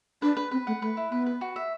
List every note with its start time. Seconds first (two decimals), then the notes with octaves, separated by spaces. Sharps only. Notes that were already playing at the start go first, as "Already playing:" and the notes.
0.22 D4 B4
0.37 B4
0.51 C4 B4
0.67 A3 F#5
0.81 A3 B4
0.97 E4
1.11 B3 B4
1.26 B4
1.41 F#4
1.56 E5